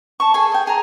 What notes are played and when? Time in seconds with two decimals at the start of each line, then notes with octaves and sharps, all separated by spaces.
0.20 A5 C#6
0.34 G#4 A4 G#5
0.52 D#5 G5
0.67 G#4 A#5